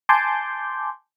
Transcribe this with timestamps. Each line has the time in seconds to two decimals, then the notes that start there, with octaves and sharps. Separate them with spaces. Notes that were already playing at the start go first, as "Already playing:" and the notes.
0.09 G#5 A5 C6 D6 G6